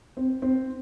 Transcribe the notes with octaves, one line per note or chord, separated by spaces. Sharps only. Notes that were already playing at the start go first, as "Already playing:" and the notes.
C4
C4